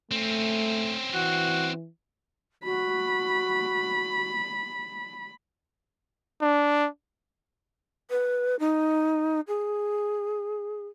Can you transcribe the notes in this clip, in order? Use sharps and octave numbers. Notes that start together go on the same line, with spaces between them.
A3 C4 C#4
E3 F#4
F#4 B5
D4
B4
D#4
G#4